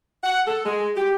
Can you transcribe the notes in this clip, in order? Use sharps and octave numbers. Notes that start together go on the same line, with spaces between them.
F#5
A4
G#3
G4